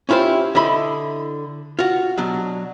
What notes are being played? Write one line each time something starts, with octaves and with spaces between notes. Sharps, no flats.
C#4 E4 F4 G4 C5
D3 E4 D#5 B5 C6
F4 F#4
B2 F#3 D4